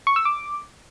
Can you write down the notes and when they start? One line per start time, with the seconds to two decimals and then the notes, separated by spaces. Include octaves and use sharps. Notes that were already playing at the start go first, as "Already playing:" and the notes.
0.07 C#6
0.16 E6
0.25 D6